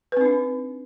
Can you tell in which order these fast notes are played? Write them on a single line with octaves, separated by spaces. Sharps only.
B4 C4 D#4 D4